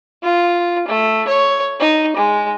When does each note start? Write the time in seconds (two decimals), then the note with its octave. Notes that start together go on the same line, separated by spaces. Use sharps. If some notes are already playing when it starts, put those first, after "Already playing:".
0.23 F4
0.88 A3
1.28 C#5
1.80 D#4
2.16 G#3